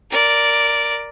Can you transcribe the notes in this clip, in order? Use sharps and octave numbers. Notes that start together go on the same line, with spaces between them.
A#4 D5